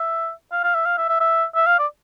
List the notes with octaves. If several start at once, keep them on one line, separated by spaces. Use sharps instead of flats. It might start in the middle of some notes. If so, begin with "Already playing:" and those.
Already playing: E5
F5
F5
E5
F5
E5
E5
E5
E5
F5
D5